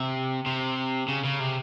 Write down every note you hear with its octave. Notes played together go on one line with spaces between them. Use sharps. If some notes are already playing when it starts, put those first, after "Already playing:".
Already playing: C3
C3
C#3
C#3
C3